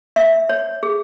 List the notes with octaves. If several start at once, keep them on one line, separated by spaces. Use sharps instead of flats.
E5
C#5
G#4